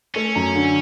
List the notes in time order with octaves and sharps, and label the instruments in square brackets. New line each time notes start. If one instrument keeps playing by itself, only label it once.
[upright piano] A3 [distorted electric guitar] C#4
[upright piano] F#2
D3